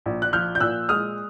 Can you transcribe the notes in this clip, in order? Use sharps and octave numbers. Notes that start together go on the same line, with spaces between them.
A#1
F#6
F3 F6 G6
G6
A#2 E6 F#6
G#3 D#6 F6